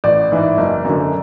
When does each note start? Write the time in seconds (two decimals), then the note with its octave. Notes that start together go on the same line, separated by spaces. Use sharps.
0.04 A1 D5
0.32 G#2 E3
0.58 F#1
0.85 F#2 D3